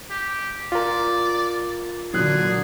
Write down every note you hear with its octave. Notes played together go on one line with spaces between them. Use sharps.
G4
F4 A#4 D5
A#2 D3 F#3 G#4 F#6